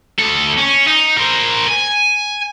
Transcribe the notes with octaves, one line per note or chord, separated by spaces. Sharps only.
D2 A4
C#4
D#4
A#4 C5
G#5